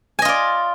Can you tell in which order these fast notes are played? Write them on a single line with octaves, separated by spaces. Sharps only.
G#5 D#5 F4 D5